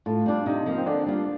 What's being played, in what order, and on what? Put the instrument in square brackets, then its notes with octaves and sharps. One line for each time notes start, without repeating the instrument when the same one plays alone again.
[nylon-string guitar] A2 [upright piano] F4
[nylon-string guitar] G3 D4 F4
[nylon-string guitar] C3 [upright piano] D#4
[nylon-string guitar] F3 A#3
[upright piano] C4
[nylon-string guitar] D3 [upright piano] D4
[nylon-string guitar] G3 A#3 F4